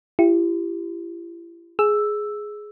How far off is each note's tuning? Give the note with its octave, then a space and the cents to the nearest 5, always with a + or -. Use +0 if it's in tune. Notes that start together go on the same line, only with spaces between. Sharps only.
E4 +40 G4 +0
G#4 +10 E6 +0